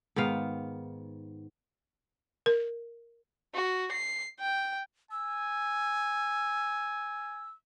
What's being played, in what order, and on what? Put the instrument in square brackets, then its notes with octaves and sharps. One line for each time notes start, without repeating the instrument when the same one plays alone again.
[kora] G#2 D#3 B3 F5
[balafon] A#4
[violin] F#4
C7
G5
[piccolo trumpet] G#5 [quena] E6